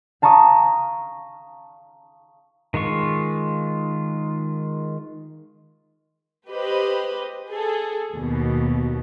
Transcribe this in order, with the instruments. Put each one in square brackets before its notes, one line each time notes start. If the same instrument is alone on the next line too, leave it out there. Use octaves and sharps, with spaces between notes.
[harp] F5 A5 A#5 C#6 D#6
[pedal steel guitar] D#3 G#3 F4 C#6
[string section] G4 B4 C5 D#5
G#4 A4
D#2 B2